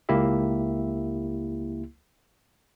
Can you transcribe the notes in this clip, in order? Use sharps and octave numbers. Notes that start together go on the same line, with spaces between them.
C#2 A#3 E4 G4 E5